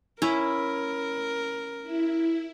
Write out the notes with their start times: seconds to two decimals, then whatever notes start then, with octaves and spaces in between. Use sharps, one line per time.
0.22 C#4 E4 A#4
1.83 E4